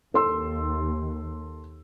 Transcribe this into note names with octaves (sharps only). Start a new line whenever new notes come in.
D#2 A4 C6 E6